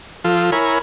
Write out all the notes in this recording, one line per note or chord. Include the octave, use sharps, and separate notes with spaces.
F3 F4 A4
E4 A#4 C#5 G#5 B5